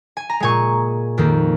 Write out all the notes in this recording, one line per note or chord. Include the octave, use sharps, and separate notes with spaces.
G#5
A#5
A#2 G#3 G#5 C#6
F2 D#3 A#3